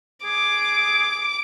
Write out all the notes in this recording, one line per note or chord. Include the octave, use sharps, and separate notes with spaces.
G#4 D6